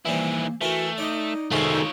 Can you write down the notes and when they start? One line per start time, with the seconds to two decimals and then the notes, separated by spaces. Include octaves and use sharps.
0.05 D#3 E3 G3 A#3 C4 E4
0.61 E3 A3 E4 F#4 A#4
0.98 D#4 D5 D#5
1.52 C3 D#3 G#3 A3 F4 C#5 C6
1.73 D#4